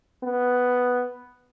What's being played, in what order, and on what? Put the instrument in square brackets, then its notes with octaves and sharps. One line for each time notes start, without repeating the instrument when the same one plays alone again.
[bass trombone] B3